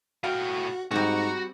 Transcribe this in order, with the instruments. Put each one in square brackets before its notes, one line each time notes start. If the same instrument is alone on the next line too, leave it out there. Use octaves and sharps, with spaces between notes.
[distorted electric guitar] A2 G5 [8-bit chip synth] F#4 [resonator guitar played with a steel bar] F5
[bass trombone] G#2 [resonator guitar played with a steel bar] G3 C4 [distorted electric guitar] F#4 [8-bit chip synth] A#5 C#6